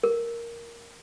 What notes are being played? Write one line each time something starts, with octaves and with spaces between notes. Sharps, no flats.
A#4